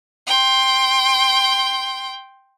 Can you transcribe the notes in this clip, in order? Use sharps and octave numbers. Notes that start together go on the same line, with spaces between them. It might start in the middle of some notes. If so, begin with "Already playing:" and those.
G5 C6